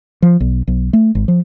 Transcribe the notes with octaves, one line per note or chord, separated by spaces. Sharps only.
F3
B1
B1
A3
G#1
F3